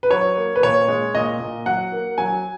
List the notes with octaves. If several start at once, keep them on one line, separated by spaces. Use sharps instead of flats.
B4
F#3 C#5
A#3
B4
A#2 C#5
G#3
A#2 D#5
A#2
F#3 F#5
A#3
F#3 G#5